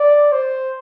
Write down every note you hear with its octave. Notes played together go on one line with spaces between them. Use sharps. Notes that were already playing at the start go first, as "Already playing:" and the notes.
Already playing: D5
C5